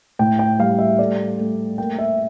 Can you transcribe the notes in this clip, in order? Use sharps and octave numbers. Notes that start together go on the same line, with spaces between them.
A2 G5
G5
G3 F5
E5
A3 D5
A3
A#3 G5
E5